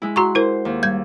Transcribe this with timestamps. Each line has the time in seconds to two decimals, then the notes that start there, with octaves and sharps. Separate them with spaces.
0.02 G#3 E4
0.16 F#4 F#5 A#5 C6 C#6
0.35 E4 A#4 C5
0.65 D#2
0.83 G3 G#6